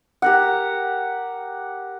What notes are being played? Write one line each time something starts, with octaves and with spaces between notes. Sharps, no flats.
G4 A#4 F#5